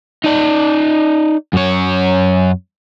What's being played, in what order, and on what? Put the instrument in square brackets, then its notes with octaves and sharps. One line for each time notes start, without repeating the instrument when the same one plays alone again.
[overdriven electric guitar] D#4 D5
F#2 C#5